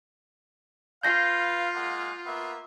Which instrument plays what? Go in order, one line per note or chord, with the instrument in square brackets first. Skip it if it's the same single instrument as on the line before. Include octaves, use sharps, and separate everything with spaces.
[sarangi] F4 [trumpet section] B4 F5 [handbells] G6 A#6 C7
[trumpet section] G#3 A#3 F#5
A#3 B3 E5